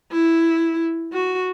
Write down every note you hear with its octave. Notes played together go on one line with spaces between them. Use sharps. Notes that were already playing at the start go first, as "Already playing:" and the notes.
E4
F#4